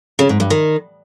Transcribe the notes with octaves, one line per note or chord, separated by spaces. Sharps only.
C#3
G#2
G2
D#3